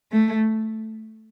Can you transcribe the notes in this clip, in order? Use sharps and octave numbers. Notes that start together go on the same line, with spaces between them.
A3